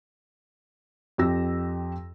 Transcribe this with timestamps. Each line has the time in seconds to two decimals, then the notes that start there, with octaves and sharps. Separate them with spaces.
1.18 F2 C4 G4 E6 A#6